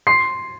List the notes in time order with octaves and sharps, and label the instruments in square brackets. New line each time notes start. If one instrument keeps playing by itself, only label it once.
[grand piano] C6 C7